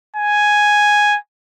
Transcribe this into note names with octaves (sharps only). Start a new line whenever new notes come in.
G#5